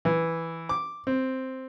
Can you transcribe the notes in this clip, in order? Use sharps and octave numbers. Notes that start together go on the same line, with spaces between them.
E3
D6
C4